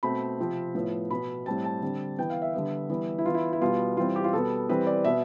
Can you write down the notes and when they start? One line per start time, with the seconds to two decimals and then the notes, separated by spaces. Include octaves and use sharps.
0.03 B2 A3 C4 B5
0.39 C3 F3 C4
0.75 A2 F3 B3
1.10 B2 B3 B5
1.46 A2 G3 C4 A5
1.64 A5
1.82 D3 G3 C4
2.18 E3 B3 G5
2.30 F5
2.42 E5
2.54 D3 G3 B3
2.90 E3 G3 B3
3.18 E4
3.25 E3 B3 F4
3.34 E4
3.53 E4
3.61 B2 G3 B3 F4
3.97 E3 G3 C4 F4
4.16 G4
4.24 F4
4.33 B2 G3 B3 A4
4.69 E3 G3 C4 B4
4.87 D5
5.04 B2 B3 E5